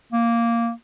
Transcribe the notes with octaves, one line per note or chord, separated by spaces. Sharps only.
A#3